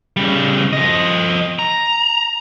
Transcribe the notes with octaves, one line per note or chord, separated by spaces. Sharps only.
C#3 G3
F3 D#5
A#5